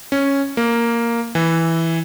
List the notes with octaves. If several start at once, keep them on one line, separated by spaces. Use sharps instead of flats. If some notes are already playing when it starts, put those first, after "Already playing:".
C#4
A#3
E3